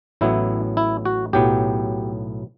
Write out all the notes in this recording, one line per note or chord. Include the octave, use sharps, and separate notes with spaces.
A1 A2 F#3 B3 E4
E4
F#4
B1 A2 F#3 B3 G4